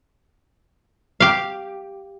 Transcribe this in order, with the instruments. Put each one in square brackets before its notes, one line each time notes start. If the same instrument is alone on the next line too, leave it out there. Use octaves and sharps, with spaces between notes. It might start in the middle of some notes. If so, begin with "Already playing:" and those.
[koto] G4 F5